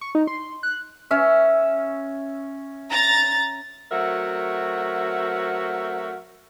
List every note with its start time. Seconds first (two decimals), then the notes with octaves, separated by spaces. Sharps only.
0.01 C#6
0.15 D#4
0.27 C6
0.63 F#6
1.11 C#4 E5
2.91 A#5 A6
3.91 F#3 A3 C4 F#4 A#4 E5